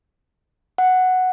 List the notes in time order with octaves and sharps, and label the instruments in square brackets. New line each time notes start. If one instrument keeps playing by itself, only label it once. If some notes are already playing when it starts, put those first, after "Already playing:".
[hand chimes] F#5